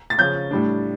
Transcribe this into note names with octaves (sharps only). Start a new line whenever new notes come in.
A6
C#3 F3 C#4 G6
A2 G3 D4